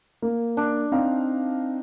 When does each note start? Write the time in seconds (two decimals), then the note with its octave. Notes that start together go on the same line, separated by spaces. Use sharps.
0.22 A#3
0.57 D4
0.92 C4 D#4 F5